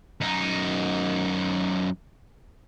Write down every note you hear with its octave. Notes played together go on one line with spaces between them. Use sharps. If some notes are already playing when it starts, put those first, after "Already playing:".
F#2 D#4